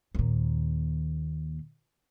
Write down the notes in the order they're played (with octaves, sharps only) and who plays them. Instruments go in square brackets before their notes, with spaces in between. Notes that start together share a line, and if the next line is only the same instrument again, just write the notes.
[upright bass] D#2 A#2